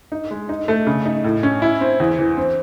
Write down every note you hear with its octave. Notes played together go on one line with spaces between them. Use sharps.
D#4
G#3
D#4
A3
C#3
D#4
A2
C#4
E4
C4
E2
E3
C4